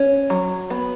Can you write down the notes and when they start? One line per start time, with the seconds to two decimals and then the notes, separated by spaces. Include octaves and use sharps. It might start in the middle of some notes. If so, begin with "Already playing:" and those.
Already playing: C#4
0.30 F#3
0.70 B3